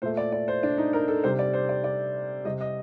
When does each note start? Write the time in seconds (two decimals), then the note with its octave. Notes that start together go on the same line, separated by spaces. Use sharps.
0.02 A#2 A3 C5
0.17 D5
0.32 D5
0.48 C5
0.63 D4
0.78 D#4
0.93 A#4
1.08 A4
1.24 C3 G3 C5
1.39 D5
1.53 C5
1.69 D5
1.84 D5
2.45 C3 G3 D#5
2.61 D#5